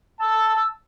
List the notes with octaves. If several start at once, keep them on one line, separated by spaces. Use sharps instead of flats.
A5 E6